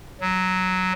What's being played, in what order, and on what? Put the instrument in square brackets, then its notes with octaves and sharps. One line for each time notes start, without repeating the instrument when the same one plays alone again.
[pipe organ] F#3